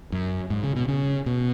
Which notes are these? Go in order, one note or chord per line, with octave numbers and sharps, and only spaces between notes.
F#2
G#2
C#3
B2
C#3
B2